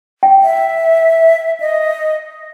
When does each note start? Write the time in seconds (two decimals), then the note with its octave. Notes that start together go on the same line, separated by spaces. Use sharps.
0.23 G5
0.43 E5
1.60 D#5